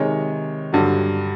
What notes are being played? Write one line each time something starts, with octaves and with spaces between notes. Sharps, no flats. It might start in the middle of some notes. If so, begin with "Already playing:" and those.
Already playing: C3 D#3 G#3 C#5
G2 D3 F#3